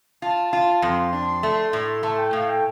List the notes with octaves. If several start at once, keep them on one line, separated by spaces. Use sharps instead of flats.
F4 A5
F4
F2 C6
D4
A3
A2
A3 A5
G5
A2 F5
G5